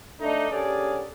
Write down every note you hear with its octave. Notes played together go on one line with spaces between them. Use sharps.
A3 D4 D#4
D3 C#4 G4 G#4 A#4 D5